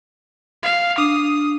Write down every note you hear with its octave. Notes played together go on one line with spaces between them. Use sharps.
F5
D4 D#6